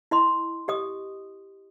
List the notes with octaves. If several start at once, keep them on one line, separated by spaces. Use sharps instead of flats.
E4 D#5 C6
G4 D#5 D#6